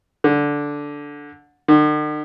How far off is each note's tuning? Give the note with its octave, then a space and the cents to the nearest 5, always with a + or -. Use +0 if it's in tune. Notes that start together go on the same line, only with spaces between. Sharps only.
D3 -10
D3 +45